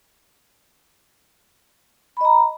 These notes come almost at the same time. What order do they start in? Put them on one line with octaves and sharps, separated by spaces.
B5 D#5 A#5